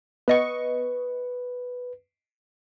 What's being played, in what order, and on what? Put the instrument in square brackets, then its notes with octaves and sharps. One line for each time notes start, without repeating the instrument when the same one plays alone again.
[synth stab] B3 D#5 C#6 [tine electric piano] B4